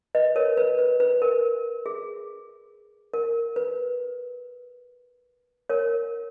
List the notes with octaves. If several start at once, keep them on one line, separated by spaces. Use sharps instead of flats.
B4 D#5
A#4 C#5
B4
B4
B4
A#4
G#4
A#4
B4
A#4 C#5